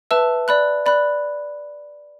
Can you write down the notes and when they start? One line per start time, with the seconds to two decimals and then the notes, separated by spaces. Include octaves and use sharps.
0.11 B4 E5 A5 E6
0.48 D5 B5 F#6
0.86 D5 B5 F#6